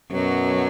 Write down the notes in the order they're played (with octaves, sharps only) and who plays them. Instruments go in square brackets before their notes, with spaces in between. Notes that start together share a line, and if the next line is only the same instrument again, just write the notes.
[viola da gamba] F#2 F#3 [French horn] B2